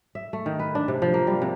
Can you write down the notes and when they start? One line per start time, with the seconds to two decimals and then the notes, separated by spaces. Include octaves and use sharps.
0.15 E5
0.33 A3
0.46 D#3
0.59 B4
0.75 D4
0.88 C3
1.02 F3
1.14 A#3
1.27 G3
1.42 C3